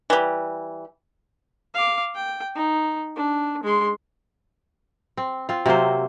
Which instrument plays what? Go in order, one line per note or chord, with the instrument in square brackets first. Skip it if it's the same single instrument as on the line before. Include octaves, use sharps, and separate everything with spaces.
[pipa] E3 G3
[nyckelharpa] F5 D6
G5
D#4
D4
G#3 C6
[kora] C4
C4 F4
C3 F#3 A#3 C5